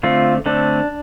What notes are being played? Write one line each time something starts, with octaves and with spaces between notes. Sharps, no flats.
D3 A3 C4 F4
D3 A3 C4 D4